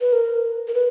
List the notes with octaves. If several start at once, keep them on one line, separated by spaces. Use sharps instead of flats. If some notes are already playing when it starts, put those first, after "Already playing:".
B4
A#4
A#4
B4